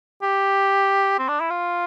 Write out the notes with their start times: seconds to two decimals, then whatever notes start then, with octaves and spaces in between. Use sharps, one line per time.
0.23 G4
1.19 C4
1.28 D4
1.41 E4
1.50 F4